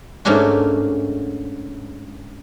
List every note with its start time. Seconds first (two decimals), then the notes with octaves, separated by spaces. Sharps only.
0.25 G#2 A3 A#3 C#4 D4 F#4